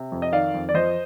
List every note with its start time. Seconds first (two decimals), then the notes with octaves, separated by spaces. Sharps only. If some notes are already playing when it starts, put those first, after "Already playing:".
Already playing: C3
0.12 F2
0.22 D#5
0.32 D#3 D5 F5
0.54 F2
0.69 D5
0.74 F3 C5 D#5